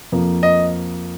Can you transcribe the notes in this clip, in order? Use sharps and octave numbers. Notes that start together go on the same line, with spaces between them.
F2 F3 A#3
D#5